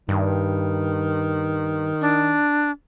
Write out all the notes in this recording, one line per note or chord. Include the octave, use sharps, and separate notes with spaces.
G2 D#3
D4